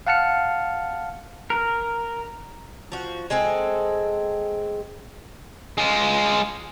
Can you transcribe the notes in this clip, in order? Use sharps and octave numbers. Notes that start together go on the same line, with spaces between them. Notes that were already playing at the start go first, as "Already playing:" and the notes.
F5 F#5 A5 F6 C#7
A#4
F3 F#4
G#3 C4 G#4 A4
G#3 F4